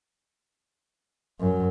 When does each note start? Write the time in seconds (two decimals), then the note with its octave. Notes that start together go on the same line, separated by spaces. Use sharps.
1.40 F#2